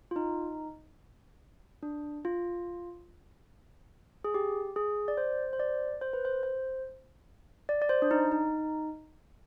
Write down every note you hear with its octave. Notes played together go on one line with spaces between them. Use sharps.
F4
D#4
D4
F4
G#4
G4
G#4
D5
C5
C5
D5
C5
B4
C5
C5
D5
D5
C5
D4
D#4
D#4